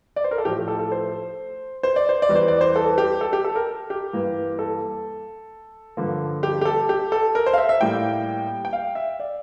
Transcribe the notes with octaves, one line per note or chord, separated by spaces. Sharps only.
D5
C5
A#4
A4
A2 F3 A3 G4
A4
A4
C5
C5
D5
C5
D5
E2 E3 G3
C5
D5
C5
A4
G4
A4
G4
A4
A#4
G4
G2 E3 A#3
A4
G2 D3 F3 A#3
G4
G4
A4
G4
A4
A#4
C5
F5
E5
E5
A2 G3 A#3 G5
G5
F5
E5
D5